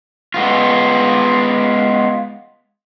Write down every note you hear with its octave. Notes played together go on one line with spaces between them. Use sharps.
G#3 B3 F4